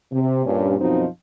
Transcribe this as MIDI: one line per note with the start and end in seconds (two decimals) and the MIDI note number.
0.12 0.45 48
0.46 0.75 43
0.46 0.75 46
0.46 0.75 61
0.80 1.05 42
0.80 1.05 47
0.80 1.05 53
0.80 1.05 60
0.80 1.05 63